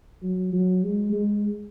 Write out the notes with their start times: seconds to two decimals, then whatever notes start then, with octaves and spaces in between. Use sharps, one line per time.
0.22 F#3
0.53 F#3
0.83 G#3
1.13 G#3